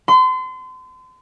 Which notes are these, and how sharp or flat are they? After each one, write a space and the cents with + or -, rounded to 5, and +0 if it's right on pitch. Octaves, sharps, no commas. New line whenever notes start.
C6 -35